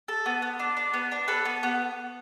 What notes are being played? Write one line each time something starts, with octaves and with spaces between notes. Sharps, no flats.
A4
B3
B3
D4
D4
B3
D4
A4 B4
B3
B3